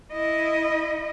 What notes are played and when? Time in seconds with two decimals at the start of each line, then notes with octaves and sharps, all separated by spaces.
0.12 E4 D#5